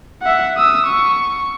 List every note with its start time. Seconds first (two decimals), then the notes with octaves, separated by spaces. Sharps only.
0.23 E5 F#5
0.57 D#6 E6
0.87 C#6